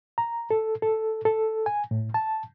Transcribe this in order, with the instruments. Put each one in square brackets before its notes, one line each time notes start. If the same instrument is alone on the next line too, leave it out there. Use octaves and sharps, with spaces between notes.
[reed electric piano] A#5
A4
A4
A4
G#5
A2
A5